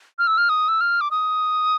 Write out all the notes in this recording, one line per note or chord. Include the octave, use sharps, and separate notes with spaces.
F6
E6
F6
D#6
E6
F6
D6
D#6